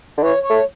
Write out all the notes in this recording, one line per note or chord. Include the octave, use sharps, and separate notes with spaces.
D3
E3 C#5
C#5
A3